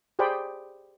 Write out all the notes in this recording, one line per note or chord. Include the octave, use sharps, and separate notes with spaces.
G4 G#4 C5 D5 G5 B5